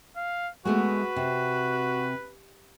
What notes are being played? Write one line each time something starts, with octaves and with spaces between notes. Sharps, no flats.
F5
G#3 A3 B3 F#4 B4
C3